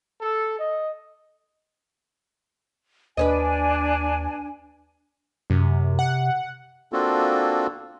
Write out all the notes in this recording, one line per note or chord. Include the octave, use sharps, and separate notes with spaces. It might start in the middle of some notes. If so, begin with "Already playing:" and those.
A4
D#5
D#2 D4 B4 C#5 D#5 G#5
F#2 C3
F#5
A#3 C4 D4 F4 F#4 A4